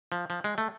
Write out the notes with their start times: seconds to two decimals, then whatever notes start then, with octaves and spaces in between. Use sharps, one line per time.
0.12 F3
0.30 F3
0.44 G#3
0.58 A3